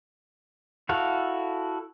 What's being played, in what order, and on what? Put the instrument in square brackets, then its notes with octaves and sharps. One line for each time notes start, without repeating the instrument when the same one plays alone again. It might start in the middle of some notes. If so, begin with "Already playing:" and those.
[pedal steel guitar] E4 F#4 A4 F5